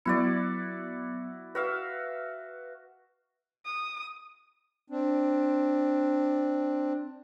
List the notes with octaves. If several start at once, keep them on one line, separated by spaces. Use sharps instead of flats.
F#3 B3 E4 F#4 D5 C#7
F#4 B4 E5 F5
D#6
C4 D4